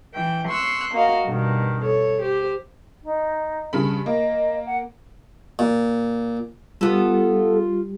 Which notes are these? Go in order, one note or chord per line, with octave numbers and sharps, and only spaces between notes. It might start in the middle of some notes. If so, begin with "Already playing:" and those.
E3 G5
C6 C#6 E6 F#6
A#3 F#4 D#5 F5
G2 B2 D#3
A4 C#5
G4 C5
D#4
G2 C#3 B5
A#3 D#5
F#5
A#2
G3 B3 F4 G4 A4